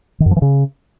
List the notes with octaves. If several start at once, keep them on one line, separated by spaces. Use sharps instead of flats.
D#3
F#2
F3
E3
C#3